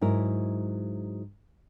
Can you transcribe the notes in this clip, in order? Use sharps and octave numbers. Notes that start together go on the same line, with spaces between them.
G#2 F#3 E4 A#4